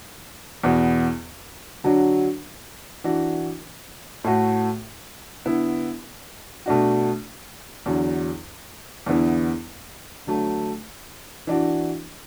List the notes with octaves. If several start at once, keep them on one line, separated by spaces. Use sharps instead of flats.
E2 B2 B3 F#4
D3 F#3 D4 F#4
E3 D4 F#4
A2 A3 F#4
D3 B3 E4
B2 A3 D4 F#4
E2 D3 F#3
E2 D3 B3 E4
D3 F#3 A3
E3 D4 F#4